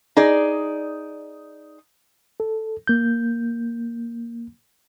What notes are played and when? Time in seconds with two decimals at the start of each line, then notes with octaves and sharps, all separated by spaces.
0.17 D#4 G#4 D5
2.40 A4
2.87 A#3 G6